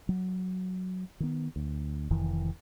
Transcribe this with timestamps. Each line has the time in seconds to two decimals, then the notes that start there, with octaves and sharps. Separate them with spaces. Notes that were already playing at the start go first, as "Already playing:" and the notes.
0.09 F#3
1.20 D#3 B3
1.56 D2
2.10 F1 F2 D#3 E3